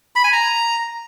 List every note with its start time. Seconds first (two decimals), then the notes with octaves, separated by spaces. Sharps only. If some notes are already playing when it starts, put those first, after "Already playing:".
0.16 B5
0.24 G#5
0.33 A#5